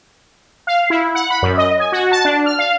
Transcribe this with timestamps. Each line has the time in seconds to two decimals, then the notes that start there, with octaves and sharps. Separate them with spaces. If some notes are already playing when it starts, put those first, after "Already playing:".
0.67 F5
0.90 E4
1.15 F#5
1.30 B5
1.43 F#2
1.58 D#5
1.80 G#5
1.92 F#4
2.12 A5
2.25 D4
2.46 F6
2.59 F5